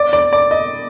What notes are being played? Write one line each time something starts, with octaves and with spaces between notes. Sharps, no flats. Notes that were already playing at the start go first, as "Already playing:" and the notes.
Already playing: D5
D5
D5
D#5